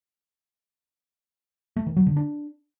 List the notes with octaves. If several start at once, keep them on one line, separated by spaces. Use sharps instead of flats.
A3
D#3
F#3
D3
D4